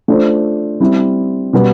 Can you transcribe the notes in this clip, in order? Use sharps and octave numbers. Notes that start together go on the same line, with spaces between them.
A3 D4 F4 C5
G3 C4 E4
B2 G3 B3